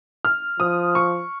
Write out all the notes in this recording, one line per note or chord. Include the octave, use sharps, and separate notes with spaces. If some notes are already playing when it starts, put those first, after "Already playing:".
F6
F3 D#6
C#6